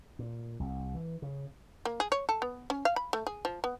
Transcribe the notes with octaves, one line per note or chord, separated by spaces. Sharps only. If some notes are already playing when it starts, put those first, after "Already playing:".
A#2
C2
E3
C#3
A#3
G#4
C#5
A4
B3
C#4
F5
B5
A3
G#4
F3
B3